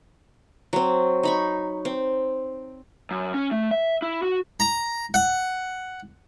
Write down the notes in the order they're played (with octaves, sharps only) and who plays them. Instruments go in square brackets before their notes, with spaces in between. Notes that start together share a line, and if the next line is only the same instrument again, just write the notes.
[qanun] F#3 C4
D#4 B5 C#6
C4
[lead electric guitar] F#2
C#4
A3
E5
E4
F#4
[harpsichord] A#5
F#5